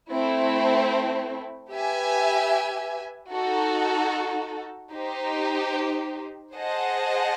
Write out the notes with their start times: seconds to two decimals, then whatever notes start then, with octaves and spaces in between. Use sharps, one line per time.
0.11 A3 C4 E4
1.70 G4 B4 E5 G#5
3.31 D#4 F#4 A4
4.92 D#4 G4 C5
6.52 G#4 C5 D#5 F#5 A5